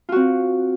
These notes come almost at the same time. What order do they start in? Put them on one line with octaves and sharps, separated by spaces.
F4 F#4 C4